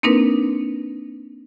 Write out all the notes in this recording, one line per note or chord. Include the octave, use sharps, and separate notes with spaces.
A#3 C4 D4 D#4 A#4 B4